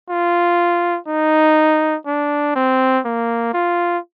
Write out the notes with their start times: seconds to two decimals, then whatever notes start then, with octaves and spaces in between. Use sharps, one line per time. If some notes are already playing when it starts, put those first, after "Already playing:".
0.10 F4
1.08 D#4
2.07 D4
2.56 C4
3.05 A#3
3.54 F4